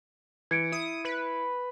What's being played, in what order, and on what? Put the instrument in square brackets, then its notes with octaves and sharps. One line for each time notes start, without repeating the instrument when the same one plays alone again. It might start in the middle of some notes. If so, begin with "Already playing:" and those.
[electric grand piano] E3 [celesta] G#6 C#7 D7
[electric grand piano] E4 [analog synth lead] D#6
[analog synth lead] B4